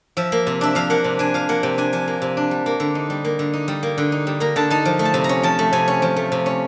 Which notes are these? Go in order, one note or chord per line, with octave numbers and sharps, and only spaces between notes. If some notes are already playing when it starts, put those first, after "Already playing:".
F3 E5
A#3
C3
D4 E5
F3 F5
A#3 F#5
C3
D4 G#5
F3 F5
A#3 F#5
C3 G5
D4 G#5
F3 G#5
A#3
C3
D4
G3
A#3
D3
D#4
G3
A#3
D3
D#4
G3
A#3
D3
D#4
G3
A#3 A#5
D3 A5
D#4 A5
F3
A3
A5
C3
A#5
C#4
F3 A5
A3
C3 G#5
C#4
F3
A3
C3
C#4